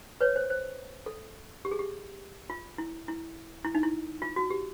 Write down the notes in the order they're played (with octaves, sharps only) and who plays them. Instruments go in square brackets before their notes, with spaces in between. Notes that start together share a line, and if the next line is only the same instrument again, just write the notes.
[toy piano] B4 C#5
C5
C5
A4
G4
G#4
G4
F4
E4
E4
E4
D#4
E4
F4
F#4
G4